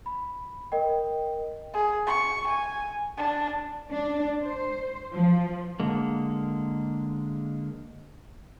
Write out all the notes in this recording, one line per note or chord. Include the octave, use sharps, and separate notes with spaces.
B5
A#4 D#5 G5
G#4
C#6
G#5
D4
D4
C5
F3
D3 G#3 A#3